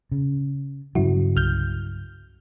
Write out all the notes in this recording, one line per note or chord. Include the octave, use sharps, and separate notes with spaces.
C#3
G2 C#3 F#3 E4 F#4
C2 F6 G6